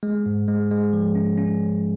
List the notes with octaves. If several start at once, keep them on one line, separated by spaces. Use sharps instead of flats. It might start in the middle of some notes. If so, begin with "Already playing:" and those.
G#3
G#2
G#3
G#3
F3
C#4
C#4